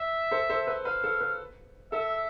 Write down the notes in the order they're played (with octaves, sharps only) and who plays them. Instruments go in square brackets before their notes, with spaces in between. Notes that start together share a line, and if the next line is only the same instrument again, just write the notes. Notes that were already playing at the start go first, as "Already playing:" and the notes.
Already playing: [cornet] E5
[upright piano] A4 C5
A4 C5
B4
[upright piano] B4 [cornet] F5
[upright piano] A4
B4
[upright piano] A4 [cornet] E5